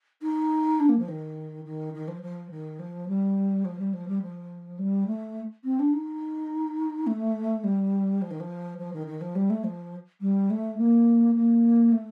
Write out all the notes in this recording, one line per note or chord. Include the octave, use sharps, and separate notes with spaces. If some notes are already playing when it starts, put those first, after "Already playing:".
D#4
D4
A#3
F3
D#3
D#3
D#3
F3
F3
D#3
F3
G3
F3
G3
F3
G3
F3
G3
A3
C4
D4
D#4
A3
G3
F3
D#3
F3
F3
D#3
D#3
F3
G3
A3
F3
G3
A3
A#3
A#3
A3